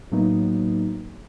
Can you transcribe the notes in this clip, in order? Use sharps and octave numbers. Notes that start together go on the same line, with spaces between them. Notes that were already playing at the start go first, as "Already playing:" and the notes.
A2 F#3 A#3 B3 D#4